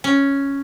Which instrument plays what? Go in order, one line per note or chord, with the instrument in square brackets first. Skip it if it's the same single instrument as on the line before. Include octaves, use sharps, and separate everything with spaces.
[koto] C#4